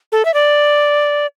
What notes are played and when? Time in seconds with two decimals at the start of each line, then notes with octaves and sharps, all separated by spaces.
0.12 A4
0.25 E5
0.34 D5